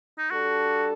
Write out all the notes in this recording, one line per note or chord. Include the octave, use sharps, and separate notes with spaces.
D#4
G3 D4 F#4 A4